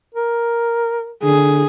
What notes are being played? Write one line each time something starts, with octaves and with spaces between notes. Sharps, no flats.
A#4
D3 G#4